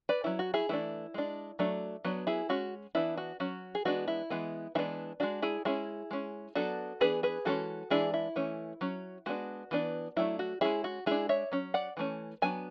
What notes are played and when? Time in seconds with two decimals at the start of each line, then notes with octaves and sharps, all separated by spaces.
0.09 B4 D5
0.24 F#3 C#4 E4
0.39 F#4
0.54 E4 G#4
0.69 E3 A3 D4 E4
1.14 G#3 D4
1.59 F#3 A3 D4
2.04 F#3 B3 D4
2.27 E4 G#4
2.49 G#3 C#4 F#4
2.95 E3 B3 D4 E4
3.17 F#4
3.40 F#3 C#4 F#4
3.75 G#4
3.85 E3 G#3 B3 D4 F#4
4.08 E4
4.30 E3 G#3 B3
4.75 E3 G#3 B3 D4 E4
5.20 G#3 D4 F#4
5.42 E4 G#4
5.65 G#3 C#4 E4 G#4
6.11 G#3 C#4
6.55 F#3 B3 D4 F#4 A4
7.00 E3 B3 D4 G#4 B4
7.23 G#4 B4
7.45 E3 G#3 C#4 F#4 A4
7.90 E3 G#3 D4 E4 G#4
8.14 E4
8.36 E3 A3 C#4
8.81 F#3 C#4
9.26 G#3 B3 D4 F#4
9.71 E3 B3 D4
10.16 F#3 A3 D4 E4
10.39 F#4
10.61 G#3 C#4 E4 G#4
10.84 F#4
11.06 G#3 D4 E4 G#4
11.29 C#5 E5
11.52 F#3 C#4
11.74 D5 F#5
11.97 E3 A3 C#4
12.42 F#3 B3 D4 G#5